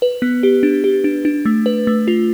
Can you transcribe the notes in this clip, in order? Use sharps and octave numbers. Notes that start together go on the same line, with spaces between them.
B4
B3
G4
D4
G4
D4
D4
A3
B4
A3
F4